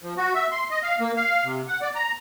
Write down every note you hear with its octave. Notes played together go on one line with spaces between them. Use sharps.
F3
F#4
E5
C6
D#5
F5
A#3
F5
C3
F#5
D5
A#5